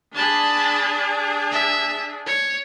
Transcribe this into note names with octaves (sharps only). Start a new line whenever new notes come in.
D4 G#4 A5 B5
E5
C#5